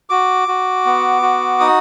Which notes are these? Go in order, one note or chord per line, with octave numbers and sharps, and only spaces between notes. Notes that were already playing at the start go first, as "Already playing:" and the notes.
F#4 D6
F#4
B3
F#4
D#4 D#6